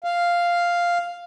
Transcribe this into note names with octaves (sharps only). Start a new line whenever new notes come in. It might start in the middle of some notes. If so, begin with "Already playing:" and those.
F5